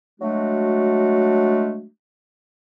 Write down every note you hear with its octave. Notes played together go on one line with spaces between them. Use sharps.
F#3 G#3 A3 D4 F#4